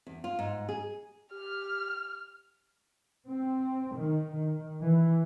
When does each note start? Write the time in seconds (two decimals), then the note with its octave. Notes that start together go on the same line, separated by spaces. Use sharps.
0.07 E2
0.24 F4
0.39 G#2
0.69 G#4
1.33 G4 F6
3.28 C4
3.96 D#3
4.33 D#3
4.82 E3